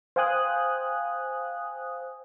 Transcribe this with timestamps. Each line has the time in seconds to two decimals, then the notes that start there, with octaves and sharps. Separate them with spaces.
0.16 C5 F5 G5 G#5 D#6 F#6